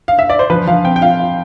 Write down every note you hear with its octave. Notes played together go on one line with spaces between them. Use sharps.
F5
E5
D5
C5
F3 B4
F3 F5
C4 G5
G5
F4 F5
F4